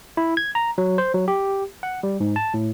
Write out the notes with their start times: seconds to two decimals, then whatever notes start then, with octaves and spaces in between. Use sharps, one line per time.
0.17 E4
0.37 G#6
0.55 A#5
0.78 F#3
0.98 C5
1.14 F#3
1.28 G4
1.83 F#5
2.03 G3
2.20 G#2
2.36 A5
2.54 A2